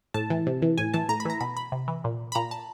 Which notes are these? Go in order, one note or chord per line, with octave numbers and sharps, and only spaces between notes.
A2 A5
E3
C3
E3
A2 G#5
E3 A5
A2 A#5
B5
E3 A#5
B2 B5
B5
C3
E3
A#2
B5
A#2 A#5
A5